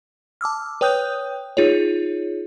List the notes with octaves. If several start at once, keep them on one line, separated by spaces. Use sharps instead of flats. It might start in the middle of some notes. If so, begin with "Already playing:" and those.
A5 D6 E6 F6
B4 C#5 G5 D#6 F#6 G6
D#4 F4 G#4 C#5